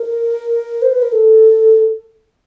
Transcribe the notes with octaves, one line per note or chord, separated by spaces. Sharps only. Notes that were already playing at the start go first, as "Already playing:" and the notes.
Already playing: A#4
C5
B4
A#4
A4